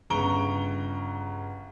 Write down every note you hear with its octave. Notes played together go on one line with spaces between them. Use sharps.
G1 C#3 A#5 C#6 D7 G7